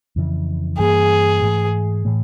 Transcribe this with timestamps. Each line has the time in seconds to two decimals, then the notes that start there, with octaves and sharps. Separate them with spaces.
0.16 F2 C#3 E3
0.79 G2 E3 G3 A#3 G#4
1.42 G#2 E3 A3
2.05 A2 E3 A3